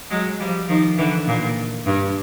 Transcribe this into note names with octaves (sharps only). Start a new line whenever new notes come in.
F#3 G#3
F3 G3
D#3 F3
D3 E3
A#2
G2